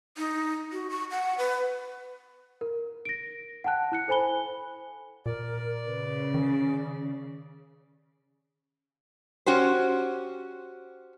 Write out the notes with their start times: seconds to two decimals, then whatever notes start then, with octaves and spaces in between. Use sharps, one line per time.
0.17 D#4
0.72 F#4
0.90 C#6
1.11 F#5
1.38 B4
2.61 A#4
3.05 A#6 D7
3.64 F#5 G5 A5 F#6
3.92 E4 F#6 C#7
4.08 A4 C5 G#5 B5 G7
5.26 A#2 A#4 D5
5.86 C#3 B4
6.34 D#3 G#4
9.46 C#4 F#4 G4 C5